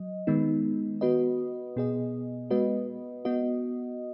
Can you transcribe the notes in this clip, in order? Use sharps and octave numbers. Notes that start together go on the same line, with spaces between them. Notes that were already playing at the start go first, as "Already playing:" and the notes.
Already playing: F#3 D#5
D#3 G#3 B3 D#4
B3 F#4 B4 D#5
B2 B3 G#4 D#5
G#3 B3 F#4 B4 D#5
B3 F#4 D#5